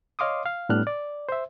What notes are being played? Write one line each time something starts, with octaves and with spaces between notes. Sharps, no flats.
C#5 D#5 F5 C6 D6 D#6
F5
A2 G3 B3 D4 F6 F#6
D5
C5 E5